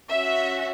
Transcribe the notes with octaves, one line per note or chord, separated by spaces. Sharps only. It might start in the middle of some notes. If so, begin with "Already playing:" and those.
C#4 F#4 E5